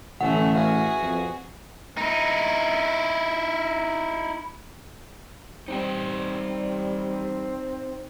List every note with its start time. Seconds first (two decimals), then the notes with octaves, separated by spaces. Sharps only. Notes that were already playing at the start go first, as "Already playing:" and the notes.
0.21 A1 D3 A3 C#4 F#5
0.55 F#4 G#4 B4 E5 F5
1.02 F2
1.97 D#4 E4
5.68 G3 C4 D#4 D5 G5